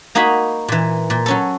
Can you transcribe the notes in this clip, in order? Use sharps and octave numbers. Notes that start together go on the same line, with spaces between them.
A#3 D#4 F#4 G#5 A#5 B5
A#2 E3
A#2
F#3 C#4 A4